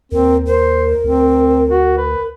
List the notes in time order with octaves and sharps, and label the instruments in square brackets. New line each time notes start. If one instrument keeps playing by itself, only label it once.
[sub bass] D#2 [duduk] C4 [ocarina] A#4
[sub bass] D#2 [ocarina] A#4 [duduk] C5
[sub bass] D2 [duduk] C4
[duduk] F#4
B4